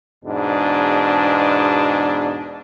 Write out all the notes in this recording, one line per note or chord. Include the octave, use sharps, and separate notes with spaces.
E2 G#2 B2 D4